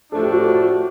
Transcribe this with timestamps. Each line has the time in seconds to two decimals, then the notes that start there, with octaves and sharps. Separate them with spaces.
0.12 A2 F3 A3 D4 A4
0.23 G4
0.32 F#4